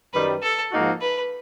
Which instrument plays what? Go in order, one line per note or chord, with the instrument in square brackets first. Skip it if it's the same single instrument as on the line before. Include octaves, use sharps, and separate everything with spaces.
[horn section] F#2 D#3 G3 [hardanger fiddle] B4
[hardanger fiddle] A4
[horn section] G#2 F3 A#3 D#4 F#4
[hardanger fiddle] B4